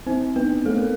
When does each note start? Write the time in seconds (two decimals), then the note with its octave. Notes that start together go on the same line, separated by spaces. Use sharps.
0.07 C4 C5
0.36 B3 B4
0.66 A3 A4
0.78 A#4